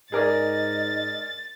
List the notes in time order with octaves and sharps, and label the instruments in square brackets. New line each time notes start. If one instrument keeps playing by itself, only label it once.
[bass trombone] G#2 [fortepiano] G#4 A#4 D5 [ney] D#5 [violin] A6